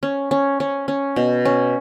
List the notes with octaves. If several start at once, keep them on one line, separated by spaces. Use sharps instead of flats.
C#4
C#4
C#4
C#4
B2
C#4